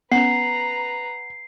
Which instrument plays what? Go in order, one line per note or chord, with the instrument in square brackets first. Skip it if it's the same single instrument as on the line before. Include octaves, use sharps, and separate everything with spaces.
[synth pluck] B3 C#4 [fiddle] B4 A#5 [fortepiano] F#5 [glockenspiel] C7